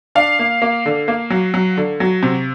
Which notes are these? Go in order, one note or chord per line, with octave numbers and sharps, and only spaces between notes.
D4 F5
A#3
A#3
D3
A#3
F#3
F#3
D3
F#3
C3